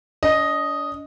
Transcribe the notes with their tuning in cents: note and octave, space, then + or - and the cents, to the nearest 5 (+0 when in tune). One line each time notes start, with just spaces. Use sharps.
D4 -40 D#5 +0